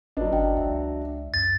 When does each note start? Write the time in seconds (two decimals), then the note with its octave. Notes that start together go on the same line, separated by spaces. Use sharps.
0.17 G1 F#3 D4 B4 D5 D#5
0.33 G1 G5
0.57 C#2 E5
1.34 F#2 A6